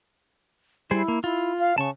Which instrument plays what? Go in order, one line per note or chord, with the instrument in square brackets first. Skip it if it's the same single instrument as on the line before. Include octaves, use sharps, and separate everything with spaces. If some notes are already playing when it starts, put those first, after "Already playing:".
[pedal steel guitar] G3 G#4 C5 [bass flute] E4
[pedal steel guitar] A#3
[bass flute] E4 [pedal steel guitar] F4
[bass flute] F5
[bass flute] C#3 [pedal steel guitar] A5 C#6